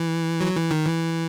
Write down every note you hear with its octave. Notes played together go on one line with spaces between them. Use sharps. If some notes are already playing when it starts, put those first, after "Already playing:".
Already playing: E3
F#3
E3
D#3
E3